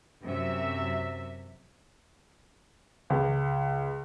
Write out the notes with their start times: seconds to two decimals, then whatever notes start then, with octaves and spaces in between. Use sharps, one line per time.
0.23 F#2 C3 F#3 E5
3.10 C#2